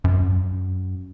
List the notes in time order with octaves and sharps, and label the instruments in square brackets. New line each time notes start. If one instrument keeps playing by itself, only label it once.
[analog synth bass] F#2